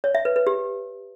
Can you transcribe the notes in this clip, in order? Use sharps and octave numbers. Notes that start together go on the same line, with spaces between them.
C#5
E5
B4
B4
G4